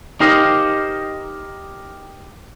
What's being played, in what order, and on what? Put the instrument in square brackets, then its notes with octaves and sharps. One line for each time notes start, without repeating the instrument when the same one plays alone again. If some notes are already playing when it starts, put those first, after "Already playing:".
[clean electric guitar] D#4 G4 A#4 C5 D#5 F5